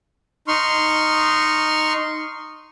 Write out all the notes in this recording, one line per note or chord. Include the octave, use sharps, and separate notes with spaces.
D#4 C6 C#6 F6